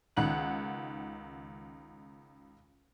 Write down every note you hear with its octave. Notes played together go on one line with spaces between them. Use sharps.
C#2 D#3 F#5 F#7